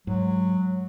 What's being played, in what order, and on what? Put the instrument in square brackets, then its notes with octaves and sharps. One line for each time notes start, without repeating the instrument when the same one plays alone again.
[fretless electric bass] G#2 [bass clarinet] F#3